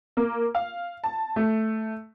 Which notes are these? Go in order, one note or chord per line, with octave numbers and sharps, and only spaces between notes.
A#3
F5
A5
A3